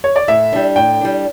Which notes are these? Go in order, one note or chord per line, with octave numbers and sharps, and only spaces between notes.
C#5
D5
A2 E5
G3 D4
A2 G5
G3 D4